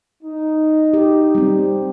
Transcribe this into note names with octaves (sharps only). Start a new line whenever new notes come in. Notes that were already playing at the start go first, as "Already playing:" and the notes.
D#4
G4
G3 C4